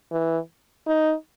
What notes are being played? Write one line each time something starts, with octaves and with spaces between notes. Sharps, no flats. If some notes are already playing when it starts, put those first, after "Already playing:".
E3
D#4